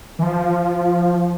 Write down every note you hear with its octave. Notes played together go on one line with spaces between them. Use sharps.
E3
F3